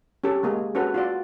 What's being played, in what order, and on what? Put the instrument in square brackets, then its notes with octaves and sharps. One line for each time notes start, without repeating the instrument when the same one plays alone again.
[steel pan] C#4 G4 A4
G#3 A#3 G#4
C#4 F#4 A4 B4
F4 F#4 D5